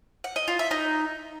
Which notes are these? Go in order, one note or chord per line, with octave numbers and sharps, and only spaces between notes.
F#5
D#5
F4
E5
D#4